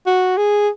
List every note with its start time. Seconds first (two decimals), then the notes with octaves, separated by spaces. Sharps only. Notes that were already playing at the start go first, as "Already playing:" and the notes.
0.06 F#4
0.37 G#4